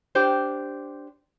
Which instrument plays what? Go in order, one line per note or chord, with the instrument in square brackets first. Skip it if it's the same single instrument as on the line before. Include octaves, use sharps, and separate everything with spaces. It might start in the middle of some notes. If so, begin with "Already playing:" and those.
[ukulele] D4 G4 C5